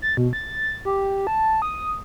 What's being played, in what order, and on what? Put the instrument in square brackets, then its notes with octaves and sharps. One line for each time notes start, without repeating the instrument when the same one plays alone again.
[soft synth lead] A6
B2
A6
G4
A5
D#6